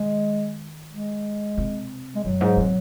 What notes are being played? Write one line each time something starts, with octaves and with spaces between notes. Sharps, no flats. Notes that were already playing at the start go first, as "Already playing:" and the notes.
Already playing: D#3 G#3
G#3
C3
G#3
F#2 F#3
G#2
C3